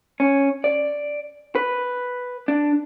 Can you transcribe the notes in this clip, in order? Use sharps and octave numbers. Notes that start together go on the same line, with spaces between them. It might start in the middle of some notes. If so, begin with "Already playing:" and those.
C#4
D5
B4
D4